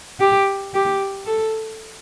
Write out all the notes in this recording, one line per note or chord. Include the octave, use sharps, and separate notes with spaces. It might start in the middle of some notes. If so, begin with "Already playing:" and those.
G4
G4
A4